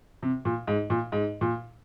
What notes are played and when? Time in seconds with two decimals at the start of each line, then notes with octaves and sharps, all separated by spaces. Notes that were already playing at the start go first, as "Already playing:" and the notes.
0.23 C3
0.45 A#2
0.67 G#2
0.90 A#2
1.12 G#2
1.41 A#2